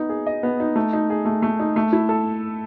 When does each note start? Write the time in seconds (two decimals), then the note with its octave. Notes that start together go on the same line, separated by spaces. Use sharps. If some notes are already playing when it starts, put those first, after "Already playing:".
Already playing: B3 D#4
0.09 G#4
0.26 D#5
0.43 B3
0.60 D#4
0.75 A3
0.93 D#4
1.10 G#4
1.25 A3
1.42 A3
1.60 D#4
1.76 A3
1.93 E4
2.09 A4